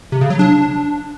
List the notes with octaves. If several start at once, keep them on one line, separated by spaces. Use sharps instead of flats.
C3
C#3
F#3
D4